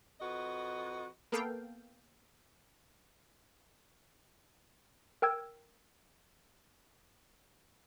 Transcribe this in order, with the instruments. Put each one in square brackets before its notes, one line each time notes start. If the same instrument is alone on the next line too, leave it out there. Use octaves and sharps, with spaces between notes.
[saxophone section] F2 F#4 B4 D#5
[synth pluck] A#3 B3 A4 F5 G5
[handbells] A#4 G5 E6 G#6